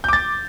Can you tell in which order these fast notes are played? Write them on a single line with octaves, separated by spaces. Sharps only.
G6 D6 A6